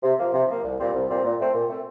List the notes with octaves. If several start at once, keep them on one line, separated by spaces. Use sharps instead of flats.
C3
F3 A#3
C3
F3 A#3
C2
A#2 G3 C4
C2
A#2 G3 C4
A#2
A3 C4
A#2
A3 C4